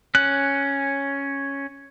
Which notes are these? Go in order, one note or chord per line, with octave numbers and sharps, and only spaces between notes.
C#4 F#6